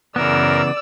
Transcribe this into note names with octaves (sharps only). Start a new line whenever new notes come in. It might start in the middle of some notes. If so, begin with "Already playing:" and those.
F#2 C#3 E3 B3 A#4 D5 E6